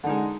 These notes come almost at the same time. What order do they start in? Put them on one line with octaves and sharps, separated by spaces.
D3 D#4 G#3